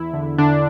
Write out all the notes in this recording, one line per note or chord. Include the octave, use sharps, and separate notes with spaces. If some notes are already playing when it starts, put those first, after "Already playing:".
Already playing: E2 E4
D3
D3 D4